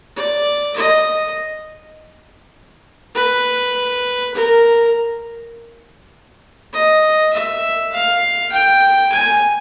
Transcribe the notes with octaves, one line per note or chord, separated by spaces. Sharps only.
D5
D#5
B4
A#4
D#5
E5
F5
G5
G#5